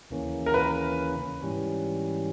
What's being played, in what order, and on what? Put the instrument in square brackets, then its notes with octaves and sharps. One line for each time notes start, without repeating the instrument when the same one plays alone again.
[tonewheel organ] D#2 C#3 E3 A#3 C#4
[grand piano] A#4
B4
[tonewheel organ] G#2 E3 G3 C#4